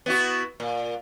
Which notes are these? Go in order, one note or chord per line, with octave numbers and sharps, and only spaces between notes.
B3 E4 F#4
A#2